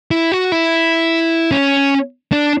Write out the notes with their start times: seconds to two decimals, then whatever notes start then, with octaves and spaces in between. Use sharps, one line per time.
0.11 E4
0.32 F#4
0.52 E4
1.52 C#4
2.32 D4